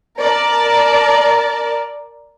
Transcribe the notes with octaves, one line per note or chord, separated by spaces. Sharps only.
A#4 D5 A5